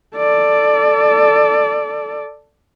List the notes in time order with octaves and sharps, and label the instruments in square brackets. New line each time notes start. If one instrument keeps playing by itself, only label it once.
[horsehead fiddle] A4 D5